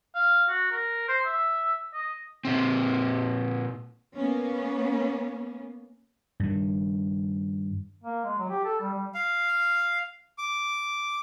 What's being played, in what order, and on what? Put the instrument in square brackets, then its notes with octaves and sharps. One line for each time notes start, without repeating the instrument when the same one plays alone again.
[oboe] F5
F#4
A#4
C5
E5
D#5
[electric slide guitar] A#2 C4
[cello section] A#3 B3 C#4
[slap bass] G2 D#3
[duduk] A#3
G#3
F#3
G4
A4
G3
G3
[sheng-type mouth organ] F5
D6